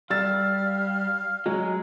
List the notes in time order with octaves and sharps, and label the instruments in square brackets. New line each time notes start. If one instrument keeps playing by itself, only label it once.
[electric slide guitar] G3 [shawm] F5 [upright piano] E6 A6
[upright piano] F#3 [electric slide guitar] G#3